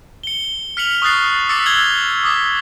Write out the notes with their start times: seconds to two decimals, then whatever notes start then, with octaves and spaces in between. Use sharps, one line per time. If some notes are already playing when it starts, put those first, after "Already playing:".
0.23 C#7 G7
0.77 F6 B6 C#7 F7 F#7
1.02 C#6 D#6 F6 F#6 A6 C7
1.49 D6 E6 A6 B6 C#7
1.66 D6 E6 G#6 F#7 G7
2.23 D6 D#6 B6